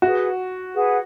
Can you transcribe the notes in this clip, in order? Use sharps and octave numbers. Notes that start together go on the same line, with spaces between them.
F#4 G#4 B4 F#5
G#4 B4 F#5